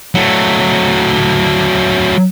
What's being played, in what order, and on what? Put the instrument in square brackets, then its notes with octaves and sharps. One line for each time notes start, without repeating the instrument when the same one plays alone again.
[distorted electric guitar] F#3 A3